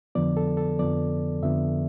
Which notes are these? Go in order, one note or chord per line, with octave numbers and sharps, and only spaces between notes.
F2 D3 F3 B3 D5
A4
A4
F2 D3 F3 B3 D5
F2 D3 F3 B3 E5